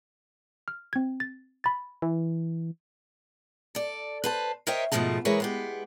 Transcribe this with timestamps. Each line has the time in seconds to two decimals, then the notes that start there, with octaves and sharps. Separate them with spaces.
0.68 F6
0.93 C4 G#6
1.20 A6
1.64 B5 A6
2.02 E3
3.75 A4 D5
4.24 B4 C5 A5
4.67 A#4 C5 C#5 D#5 E5 G5
4.92 G#2 B2 F3 G#3 A3 A5
5.25 E3 G#3 G#4 A#4 B4 C#5
5.40 G#3 B3 G4